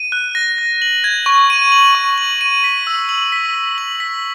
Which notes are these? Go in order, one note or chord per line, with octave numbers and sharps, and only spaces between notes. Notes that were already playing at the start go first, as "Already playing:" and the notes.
Already playing: D#7
F#6
A#6
A#6
F#7
G#6
C#6
D#7
F#7
C#6
F#7
D#7
B6
E6
F#7
B6
B6
F#7
B6